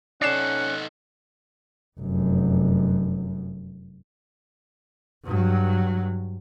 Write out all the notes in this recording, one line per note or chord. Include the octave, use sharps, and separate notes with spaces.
C#4 D#4 A4 D5 F#5 C7 E7
F1 F#2
G2 F#3